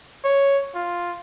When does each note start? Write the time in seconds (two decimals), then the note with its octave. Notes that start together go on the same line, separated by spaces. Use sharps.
0.24 C#5
0.75 F4